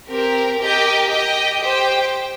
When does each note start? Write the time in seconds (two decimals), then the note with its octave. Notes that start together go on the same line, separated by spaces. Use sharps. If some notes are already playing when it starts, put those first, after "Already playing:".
0.10 C4 G4 A#4
0.60 G4 A#4 D#5 G5
1.10 G4 D#5 G5
1.60 G4 C5 G5